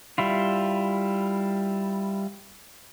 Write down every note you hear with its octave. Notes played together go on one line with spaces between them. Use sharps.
G3 E4 F4